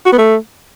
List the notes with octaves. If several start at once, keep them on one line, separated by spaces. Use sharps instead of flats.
F#4
B3
A3